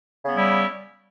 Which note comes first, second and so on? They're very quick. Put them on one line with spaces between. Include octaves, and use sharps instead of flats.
C#3 B3 G3 E4